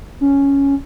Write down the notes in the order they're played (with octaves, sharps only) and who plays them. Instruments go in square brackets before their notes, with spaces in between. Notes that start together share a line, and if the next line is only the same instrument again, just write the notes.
[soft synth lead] C#4